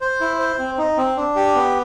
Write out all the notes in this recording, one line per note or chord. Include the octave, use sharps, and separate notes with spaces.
C5
E4
C5
C4
D#4
C4
D4
G4
B3